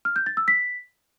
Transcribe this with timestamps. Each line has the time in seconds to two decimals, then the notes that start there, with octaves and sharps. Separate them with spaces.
0.05 F6
0.16 G6
0.26 A6
0.37 E6
0.48 B6